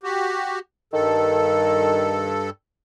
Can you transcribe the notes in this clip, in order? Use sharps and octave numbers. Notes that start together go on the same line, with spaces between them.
F#4 G4
G2 D#3 A4